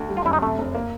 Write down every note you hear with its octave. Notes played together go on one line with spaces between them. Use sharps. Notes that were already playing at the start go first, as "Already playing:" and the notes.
Already playing: D2
G3
F4
F#2 E4
D#4
C3 A3
F1
A#3